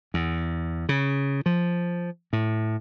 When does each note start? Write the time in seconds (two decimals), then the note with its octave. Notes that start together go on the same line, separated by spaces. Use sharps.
0.14 E2
0.89 C#3
1.46 F3
2.33 A2